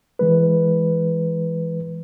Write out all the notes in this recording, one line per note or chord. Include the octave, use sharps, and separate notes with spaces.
E3 G#3 B4